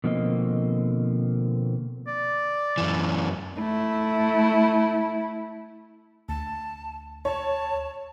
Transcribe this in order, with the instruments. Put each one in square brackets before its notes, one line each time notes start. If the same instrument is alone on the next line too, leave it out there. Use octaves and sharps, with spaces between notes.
[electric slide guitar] B2 D3 F3 A#3 C4 D#5
[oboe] D5
[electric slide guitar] F#2 E3
[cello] A3 E4
[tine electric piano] D2 [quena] A5
[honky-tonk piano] C#5 [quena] A5